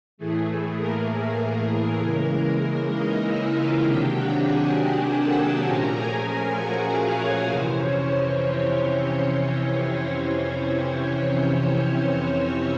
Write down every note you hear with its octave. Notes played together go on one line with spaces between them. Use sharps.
A2 E3 A3 G#4
G#4
A#3 A#4
C#3 E3 G#3
D#4 D#5
E4 E5
F4 F5
C3 D#3 F#3 A#3 D4 G4 G5
F#4 F#5
G#4 G#5
G#4 G#5
A4 A5
A#2 F3 A3 C#4 A#4 A#5
G#4 G#5
A#4 A#5
F#4 F#5
F4 F5
C#4 C#5
F2 C3 E3 C4 C5
C#4 C#5
C4 C5
C4 C5